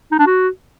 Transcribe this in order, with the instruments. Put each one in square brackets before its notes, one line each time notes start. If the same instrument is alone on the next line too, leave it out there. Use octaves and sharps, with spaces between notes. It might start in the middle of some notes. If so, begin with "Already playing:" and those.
[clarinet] D#4
D4
F#4